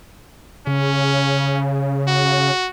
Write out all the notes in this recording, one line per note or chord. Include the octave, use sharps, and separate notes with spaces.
C#3 C#4
F#4